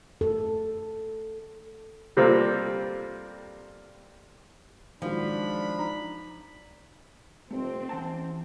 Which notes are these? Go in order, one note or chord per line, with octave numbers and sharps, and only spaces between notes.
A4
C3 G3 A#3 C4 F4 A4
D#3 F3 F#3 G#3 D4 B5
D#4 A#5
F1 A3 C4
E3 C#4 F#5 A5